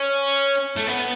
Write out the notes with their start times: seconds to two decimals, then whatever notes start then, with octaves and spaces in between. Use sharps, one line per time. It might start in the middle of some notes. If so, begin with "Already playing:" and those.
Already playing: C#4
0.76 A3
0.87 B3